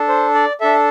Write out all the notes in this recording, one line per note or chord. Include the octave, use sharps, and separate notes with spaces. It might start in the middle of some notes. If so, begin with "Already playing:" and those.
Already playing: D4 A4
C5
D5
D4 A4 E5